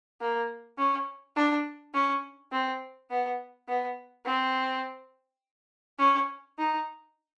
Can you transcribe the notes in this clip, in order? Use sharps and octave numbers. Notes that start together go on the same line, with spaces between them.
A#3
C#4
D4
C#4
C4
B3
B3
C4
C#4
D#4